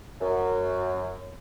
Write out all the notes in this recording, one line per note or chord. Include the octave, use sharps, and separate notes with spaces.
F#2